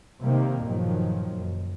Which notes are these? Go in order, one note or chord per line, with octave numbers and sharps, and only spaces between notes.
C3 D#3 G3 A#3
G1 A#2 D#3 F3 F#3
F#1